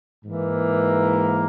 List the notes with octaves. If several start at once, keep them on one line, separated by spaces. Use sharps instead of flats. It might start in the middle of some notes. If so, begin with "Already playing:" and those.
G#2 E3 A#3